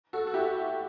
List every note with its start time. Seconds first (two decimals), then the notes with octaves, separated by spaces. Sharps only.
0.13 F#4 A4
0.27 F#4
0.34 E4 G4